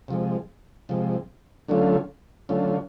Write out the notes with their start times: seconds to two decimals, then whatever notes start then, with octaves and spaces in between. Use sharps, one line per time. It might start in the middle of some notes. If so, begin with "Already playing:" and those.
0.08 C3 F3 G#3
0.89 C3 F3 G#3
1.68 D3 F#3 A3 C#4 F4
2.49 D3 F#3 A3 C#4 F4